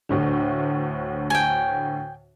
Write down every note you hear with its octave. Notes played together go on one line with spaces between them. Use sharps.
D2 A2 D3
G5 G#5